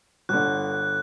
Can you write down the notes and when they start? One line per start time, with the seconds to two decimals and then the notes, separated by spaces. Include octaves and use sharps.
0.29 G1 D3 F#6